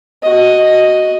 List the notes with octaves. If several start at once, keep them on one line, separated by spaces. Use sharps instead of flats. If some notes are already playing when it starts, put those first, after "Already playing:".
F#4 D#5